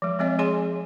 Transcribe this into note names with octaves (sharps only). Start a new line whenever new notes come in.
F3 G#3
F3 G#3 C4 C#5 D#5
G#4 C#5 G#5 C6